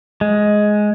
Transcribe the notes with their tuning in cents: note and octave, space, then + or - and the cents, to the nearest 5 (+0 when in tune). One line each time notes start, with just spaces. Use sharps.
G#3 +10